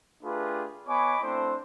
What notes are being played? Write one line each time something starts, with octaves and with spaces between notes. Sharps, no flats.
A3 D4 F4 G4 G#4 B4
B3 C#5 D#5 G#5 B5 D6
A3 C4 D4 E4 C5